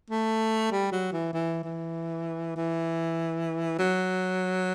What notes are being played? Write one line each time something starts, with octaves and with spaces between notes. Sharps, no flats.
A3
G3
F#3
E3
E3
E3
E3
F#3